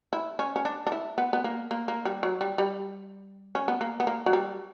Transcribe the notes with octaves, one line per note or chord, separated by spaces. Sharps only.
E4
C#4
C#4
D4
D4
E4
B3
B3
A#3
A#3
A#3
G3
F#3
G3
G3
C#4
B3
A#3
B3
A#3
F#3
G3